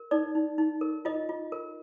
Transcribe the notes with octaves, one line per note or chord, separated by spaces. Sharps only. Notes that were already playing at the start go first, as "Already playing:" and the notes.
Already playing: A#4
D#4 D5
D#4
D#4
A#4
F4 D#5
F4
A#4